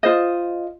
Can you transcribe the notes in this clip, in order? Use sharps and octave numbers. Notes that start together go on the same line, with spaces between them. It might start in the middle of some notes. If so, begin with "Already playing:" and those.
F4 C5 D#5